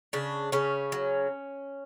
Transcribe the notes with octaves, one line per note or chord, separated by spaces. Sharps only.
C#3 D4
C#3 C#4
F#3